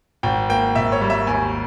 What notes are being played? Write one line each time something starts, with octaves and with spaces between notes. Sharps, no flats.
G#1 G5
A#3 G5
G#1 E5
C#5
G3
E5
D#2 G#5